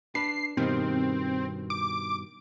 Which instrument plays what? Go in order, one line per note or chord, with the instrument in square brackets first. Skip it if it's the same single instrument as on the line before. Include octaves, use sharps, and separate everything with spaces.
[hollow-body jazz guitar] D4 B4 [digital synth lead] C7
[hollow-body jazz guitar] G2 B2 D#3 [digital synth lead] C4
[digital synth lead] D6